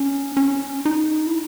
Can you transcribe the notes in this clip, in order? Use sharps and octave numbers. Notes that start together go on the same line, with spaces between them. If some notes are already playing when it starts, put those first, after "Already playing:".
Already playing: C#4
C#4
D#4
E4